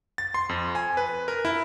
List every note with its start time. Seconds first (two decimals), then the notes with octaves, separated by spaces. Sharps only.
0.18 A6
0.34 C6
0.49 F2
0.75 G#5
0.97 B4
1.28 A#4
1.45 E4